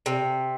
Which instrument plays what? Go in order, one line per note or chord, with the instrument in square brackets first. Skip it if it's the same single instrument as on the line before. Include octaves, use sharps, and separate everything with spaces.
[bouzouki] C3